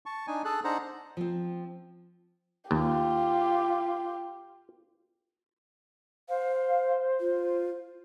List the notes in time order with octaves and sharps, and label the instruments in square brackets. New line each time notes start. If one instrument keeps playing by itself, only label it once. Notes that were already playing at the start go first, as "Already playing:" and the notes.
[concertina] A5 C#6
D4 D#4 G#5
G#4 A4 A5 F#6
D4 D#4 C5 F#5 A#5 F#6
[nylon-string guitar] F3 C4
[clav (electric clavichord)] D#2 [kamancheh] F4 G4
[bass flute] C5 [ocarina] F5
[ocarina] F4